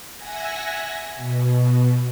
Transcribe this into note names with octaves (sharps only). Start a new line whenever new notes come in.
E5 F#5 G#5 G#6 A#6
B2